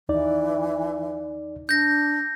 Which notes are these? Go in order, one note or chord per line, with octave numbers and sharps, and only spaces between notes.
D#2 E3 D#4 D5
D4 G6 A#6